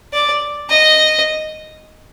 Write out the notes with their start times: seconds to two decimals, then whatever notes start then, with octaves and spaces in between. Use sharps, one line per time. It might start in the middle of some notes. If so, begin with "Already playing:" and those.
0.13 D5
0.69 D#5